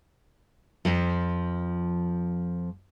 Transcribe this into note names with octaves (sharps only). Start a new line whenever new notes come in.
F2 F3